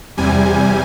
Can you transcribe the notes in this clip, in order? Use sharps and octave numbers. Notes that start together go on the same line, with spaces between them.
E2 C3 G3 G#5